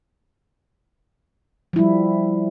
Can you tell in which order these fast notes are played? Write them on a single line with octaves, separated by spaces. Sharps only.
F3 E4 G3